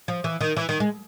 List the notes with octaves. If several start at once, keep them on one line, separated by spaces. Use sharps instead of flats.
F3
E3
D#3
E3
D#3
G#3